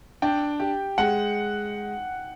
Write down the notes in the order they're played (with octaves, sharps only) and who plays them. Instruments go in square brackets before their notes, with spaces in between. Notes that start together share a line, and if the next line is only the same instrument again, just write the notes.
[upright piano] D4 [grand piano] G5
[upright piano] G4
[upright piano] G#3 [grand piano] F#5